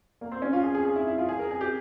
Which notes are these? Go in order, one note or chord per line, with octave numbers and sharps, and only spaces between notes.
A#3
C4
C#4
F4
G#4
G#4
G#4
E4
E4
F4
G#4
A#4
G#4
G4